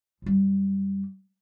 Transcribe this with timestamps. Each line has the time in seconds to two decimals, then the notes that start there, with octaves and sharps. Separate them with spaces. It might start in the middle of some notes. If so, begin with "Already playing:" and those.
0.22 F#2 G3